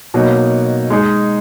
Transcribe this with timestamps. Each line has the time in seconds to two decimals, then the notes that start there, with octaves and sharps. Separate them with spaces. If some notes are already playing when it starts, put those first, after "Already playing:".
0.14 B2 F#3 A#3 D#4
0.90 G#3 D#4 G#4